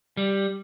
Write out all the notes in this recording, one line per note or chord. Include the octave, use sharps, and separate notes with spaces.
G3